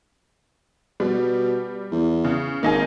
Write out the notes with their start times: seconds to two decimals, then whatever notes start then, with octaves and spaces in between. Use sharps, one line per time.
1.00 B2 G3
1.92 E2
2.24 C#3
2.63 G#1 A#3 D#4 G#4